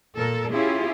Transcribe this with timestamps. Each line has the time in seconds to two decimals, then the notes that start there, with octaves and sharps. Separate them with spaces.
0.17 A#2 A4 A#4
0.52 C#4 E4 F4 G4 G#4